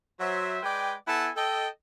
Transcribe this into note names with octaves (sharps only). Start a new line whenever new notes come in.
F#3 C5 E5
G#3 B4 D5 G5
B3 E4 A4 F#5 G#5 A5
A4 D#5 G5